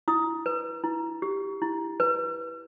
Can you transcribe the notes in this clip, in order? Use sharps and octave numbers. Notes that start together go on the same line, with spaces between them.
E4 D#6
B4
E4
G4
E4
B4